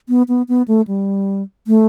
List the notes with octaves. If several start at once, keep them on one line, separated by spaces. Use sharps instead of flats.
B3
B3
B3
A3
G3
A3